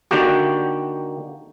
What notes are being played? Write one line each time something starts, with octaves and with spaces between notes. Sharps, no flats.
D3 D#3 A#3 F#4 G4